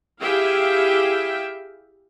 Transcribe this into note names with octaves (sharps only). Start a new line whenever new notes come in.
E4 G4 G#4 E5 F5 G5